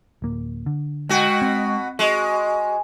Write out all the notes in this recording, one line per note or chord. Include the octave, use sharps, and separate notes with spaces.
D1 A#3
D3
B2 G#3 F#4 G5
C4
G#3 F#4